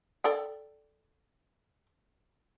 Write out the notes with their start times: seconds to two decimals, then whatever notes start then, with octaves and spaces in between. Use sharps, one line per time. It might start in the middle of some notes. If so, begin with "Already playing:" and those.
0.24 A4 D5 G5